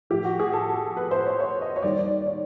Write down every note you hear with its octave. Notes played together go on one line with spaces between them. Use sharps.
A2 F3 G4
F#4
G#4
A4
B4
C5
C#5
C#5
D#5
C#5
D#2 D#3 G3 D5
C#5